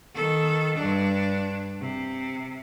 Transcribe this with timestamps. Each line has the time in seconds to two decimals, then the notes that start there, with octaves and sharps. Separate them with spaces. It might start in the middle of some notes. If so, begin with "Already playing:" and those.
0.15 D#3 A4
0.75 G2 D4
1.80 C3